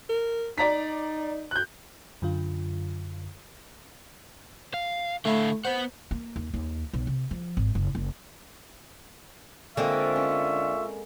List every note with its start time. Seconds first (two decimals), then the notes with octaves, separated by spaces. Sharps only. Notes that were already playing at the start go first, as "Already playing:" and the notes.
0.09 A#4
0.58 D#4 D5 A#5 B6
1.51 F#6 G6
2.22 F#2 D3 F4
4.74 F5
5.25 D3 A3 E4 F5
5.65 B3 C5 F#5
6.11 A#3
6.36 D#2
6.54 D#2
6.93 B1
7.07 C3
7.31 F3
7.57 G#1
7.75 F#1
7.95 F#1
9.77 D3 G#3 A#3 C4 F4 E5 C#6
10.16 C#4